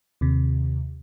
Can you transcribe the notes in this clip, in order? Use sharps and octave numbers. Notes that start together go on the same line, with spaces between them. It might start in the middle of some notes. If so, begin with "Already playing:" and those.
D#2 C3